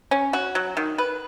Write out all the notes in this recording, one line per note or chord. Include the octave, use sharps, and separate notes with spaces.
C#4
F#4
F#3
D#3
B4